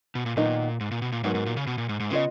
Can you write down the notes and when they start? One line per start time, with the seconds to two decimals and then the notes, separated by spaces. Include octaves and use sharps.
0.15 B2
0.26 A#2
0.37 A#2 D#3 F#3 B3 D#4
0.80 G#2
0.91 A#2
1.02 B2
1.12 A#2
1.24 G#2 F#3 B3 D#4 A#4
1.35 G#2
1.46 A#2
1.57 C#3
1.67 B2
1.78 A#2
1.89 G#2
2.00 G#2
2.11 C#3 B3 F4 B4 D#5